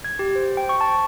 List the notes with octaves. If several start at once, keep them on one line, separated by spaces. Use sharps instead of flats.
G#6
G4
C5
G5
C#6
A5